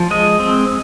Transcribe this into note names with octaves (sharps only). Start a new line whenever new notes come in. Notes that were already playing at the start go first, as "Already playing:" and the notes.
Already playing: F3
G#3 D#5
C4